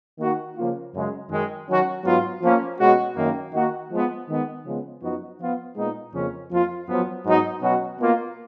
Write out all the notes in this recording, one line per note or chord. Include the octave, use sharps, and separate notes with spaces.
D#3 A#3 D#4 F#4
C#3 F3 A#3 F4
F#2 C#3 G#3 C#4
F#2 D#3 G#3
D#3 F#3 C#4 F#4
G#2 F#3 B3 F4
F3 A#3 C#4
B2 G#3 C#4 F#4
F#2 D#3 A#3
D#3 A#3 D#4 F#4
F3 G#3 B3
D#3 G#3 B3
C#3 F3 G#3 B3
F#2 F3 B3 D#4 F#4
F3 B3 F4
A#2 G#3 B3 D#4
F2 C#3 F3 A#3 C#4
F2 F3 A#3 F4
F#2 F3 B3
G#2 F#3 B3 D#4 F#4
B2 F#3 C#4 F#4
B2 A#3 F4